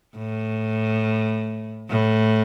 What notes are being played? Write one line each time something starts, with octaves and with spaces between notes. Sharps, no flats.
A2
A2